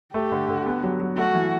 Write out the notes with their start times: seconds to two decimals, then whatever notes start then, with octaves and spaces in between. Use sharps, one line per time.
0.14 A3 G4
0.32 D3
0.48 D3
0.66 B3
0.83 F#3
1.00 F#3
1.17 A3 F#4
1.35 E3